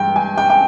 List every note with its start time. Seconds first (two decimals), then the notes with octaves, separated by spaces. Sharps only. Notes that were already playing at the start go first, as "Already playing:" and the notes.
Already playing: G2 E3 G#3 G5
0.16 G#5
0.38 G5
0.50 G5